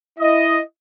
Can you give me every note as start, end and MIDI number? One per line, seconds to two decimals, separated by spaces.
0.18 0.60 64
0.18 0.60 75